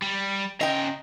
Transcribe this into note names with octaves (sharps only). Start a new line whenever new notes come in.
G3
C#3 D#5 G5 A#5